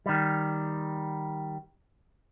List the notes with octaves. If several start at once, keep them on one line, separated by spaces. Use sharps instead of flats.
D#3 G3